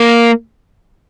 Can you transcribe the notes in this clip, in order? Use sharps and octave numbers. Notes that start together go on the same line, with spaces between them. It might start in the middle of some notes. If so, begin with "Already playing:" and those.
Already playing: A#3